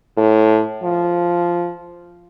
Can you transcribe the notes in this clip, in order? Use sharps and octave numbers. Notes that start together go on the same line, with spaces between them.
A2
F3